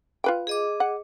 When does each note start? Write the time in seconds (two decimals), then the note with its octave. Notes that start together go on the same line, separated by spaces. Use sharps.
0.24 F4 B4 G5
0.47 G#4 D#5 D6
0.80 F#5